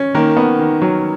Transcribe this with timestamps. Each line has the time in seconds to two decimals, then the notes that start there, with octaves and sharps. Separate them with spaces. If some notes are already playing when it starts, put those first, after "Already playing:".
Already playing: C#4
0.15 D#3 A#3 A#4
0.37 B3
0.59 D#3
0.82 F#3